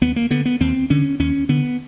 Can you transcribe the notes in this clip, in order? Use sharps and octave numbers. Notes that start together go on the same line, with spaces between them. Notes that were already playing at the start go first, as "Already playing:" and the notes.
D#2 B3
A#3
D3 B3
B3
D#2 C4
D3 C#4
D#2 C#4
D3 B3